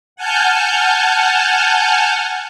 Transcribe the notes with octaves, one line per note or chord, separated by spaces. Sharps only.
F#5 G#5 A5 F6 G6